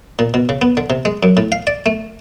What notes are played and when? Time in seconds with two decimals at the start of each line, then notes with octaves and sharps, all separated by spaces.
0.19 A#2
0.34 B2
0.49 C#3
0.62 B3
0.77 D3
0.90 C3
1.05 G#3
1.23 F#2
1.37 A2
1.52 F5
1.67 D5
1.86 A3